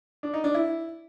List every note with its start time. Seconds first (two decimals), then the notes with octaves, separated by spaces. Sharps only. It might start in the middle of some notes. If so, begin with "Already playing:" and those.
0.23 D4
0.34 D#4
0.44 D4
0.54 E4